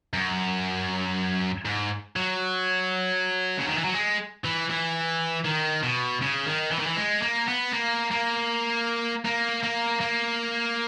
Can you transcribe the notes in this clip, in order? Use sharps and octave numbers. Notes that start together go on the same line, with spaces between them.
F#2
G#2
F#3
C#3
D#3
E3
F#3
G#3
E3
E3
D#3
B2
C#3
D#3
E3
D#3
E3
G#3
A#3
B3
A#3
A#3
A#3
A#3
A#3